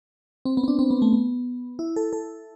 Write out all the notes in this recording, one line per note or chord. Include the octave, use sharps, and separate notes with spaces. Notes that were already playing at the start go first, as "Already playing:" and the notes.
C4
B3
C4
D4
C4
B3
A3
B3
E4
A4
A4